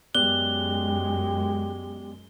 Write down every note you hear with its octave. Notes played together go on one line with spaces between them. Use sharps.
F#2 G#3 B3 G4 D5 F#6 G7